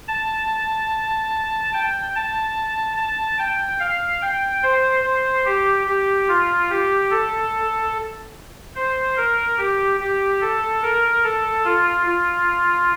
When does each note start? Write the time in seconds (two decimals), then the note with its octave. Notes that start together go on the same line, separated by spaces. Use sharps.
0.08 A5
1.73 G5
2.15 A5
2.97 A5
3.38 G5
3.80 F5
4.21 G5
4.63 C5
5.04 C5
5.45 G4
5.87 G4
6.28 F4
6.70 G4
7.11 A4
8.75 C5
9.17 A#4
9.58 G4
10.00 G4
10.41 A4
10.82 A#4
11.23 A4
11.65 F4
12.06 F4